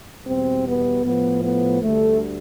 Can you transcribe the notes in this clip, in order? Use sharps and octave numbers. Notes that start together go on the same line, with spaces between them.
E2 B2 G3 C4
B3
A2 F3 B3
B3
D2 D3 G3 A3